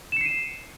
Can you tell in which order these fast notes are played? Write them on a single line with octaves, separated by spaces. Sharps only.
E7 C#7 C7 D#7